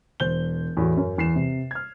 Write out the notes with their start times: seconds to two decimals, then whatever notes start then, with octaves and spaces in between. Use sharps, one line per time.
0.20 E1 C5 G6 G7
0.77 E2 A2 F#4
0.97 F#2
1.18 E2 C7 E7
1.36 C3
1.71 F6 G#6